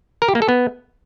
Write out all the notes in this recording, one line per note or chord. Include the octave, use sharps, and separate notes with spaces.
A#4
G4
A#3
A4
B3